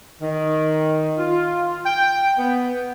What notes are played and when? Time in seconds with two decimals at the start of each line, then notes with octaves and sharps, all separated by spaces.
0.22 D#3
1.19 F4
1.86 G5
2.39 B3